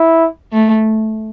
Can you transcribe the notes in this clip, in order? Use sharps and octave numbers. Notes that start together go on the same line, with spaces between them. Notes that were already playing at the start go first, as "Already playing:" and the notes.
Already playing: E4
A3